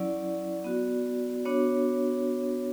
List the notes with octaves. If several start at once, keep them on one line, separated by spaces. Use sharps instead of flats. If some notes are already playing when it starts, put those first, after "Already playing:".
Already playing: F#3 C#4 E4 D5
B3 F#4
B3 D4 F#4 C#5